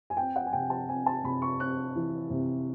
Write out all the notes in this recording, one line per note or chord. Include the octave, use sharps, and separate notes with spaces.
G#5
C4 G5
F#5
G#5
C3 G5
A5
C4 G#5
A5
C3 B5
C#6
C4 F#6
E3
C3